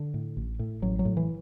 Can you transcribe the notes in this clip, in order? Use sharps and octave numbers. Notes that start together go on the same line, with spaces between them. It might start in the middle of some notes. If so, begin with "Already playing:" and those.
Already playing: D3
A2
A1
A2
A1 F#3
F#3
A2
E3